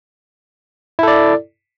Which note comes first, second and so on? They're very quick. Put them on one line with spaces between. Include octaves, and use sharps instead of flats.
E4 A4 D5